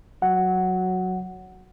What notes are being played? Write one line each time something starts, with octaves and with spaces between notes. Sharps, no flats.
F#3 F#5